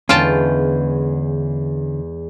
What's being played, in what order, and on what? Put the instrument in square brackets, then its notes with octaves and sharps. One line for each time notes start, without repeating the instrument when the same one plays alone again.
[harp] E2 G#3 B3 [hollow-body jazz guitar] D3 C#4 [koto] F4 G5 A5